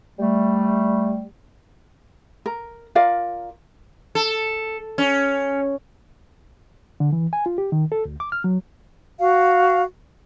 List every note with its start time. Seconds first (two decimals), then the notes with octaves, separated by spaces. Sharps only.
0.19 G3 A3
2.46 A#4
2.95 F4 A#4 D5 F5
4.15 A4
4.98 C#4
7.00 D3
7.13 E3
7.33 G#5
7.46 F4
7.58 G4
7.72 D#3
7.92 A4
8.05 D2
8.20 D6
8.32 F6
8.44 F#3
9.19 F#4 F5